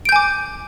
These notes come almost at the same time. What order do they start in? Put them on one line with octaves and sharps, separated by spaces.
D7 G6 G#5 D6